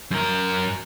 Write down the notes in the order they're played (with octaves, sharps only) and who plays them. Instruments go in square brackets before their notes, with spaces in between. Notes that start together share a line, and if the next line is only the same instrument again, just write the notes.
[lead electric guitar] F#2 A#4